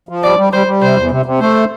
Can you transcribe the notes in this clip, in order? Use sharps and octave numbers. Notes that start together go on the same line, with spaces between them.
F3
G3 D5
G3
G3 C5
G3
C3 C5
E2
C3
C3
A3 C5